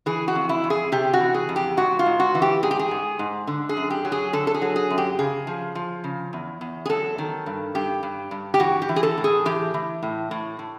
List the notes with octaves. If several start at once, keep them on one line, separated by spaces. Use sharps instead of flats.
E3 G#4
F#4
F2
E4
F2
G#4
C3 G4
F#4
E3
G#4
F2
G4
G#2 F#4
F4
G#2
F#4
E3
G4
G#2 G#4
G4
G#4
G#2
G#2
D3
G#4
F#2
G4
F#3
G#4
D3 A4
A4
G#4
F#3
G#4
F#2
G4
C#3 G#4
F3
F3
C#3
E2
E2
G#4
F#3 A4
D#3
G2
G2 G4
G2
G2
G4
E3 F#4
G4
E3
G#4
A4
A2
G#4
E3 G4
E3
A2
A2
A2